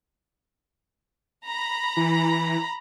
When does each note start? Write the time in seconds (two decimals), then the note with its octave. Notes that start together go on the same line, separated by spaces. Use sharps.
1.47 A#5 B5
1.97 E3